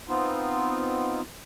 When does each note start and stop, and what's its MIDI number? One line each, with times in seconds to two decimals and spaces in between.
0.09 1.21 59
0.09 1.21 60
0.09 1.21 63
0.09 1.21 65